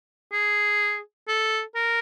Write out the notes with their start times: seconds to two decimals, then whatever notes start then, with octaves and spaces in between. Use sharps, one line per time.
0.33 G#4
1.28 A4
1.76 A#4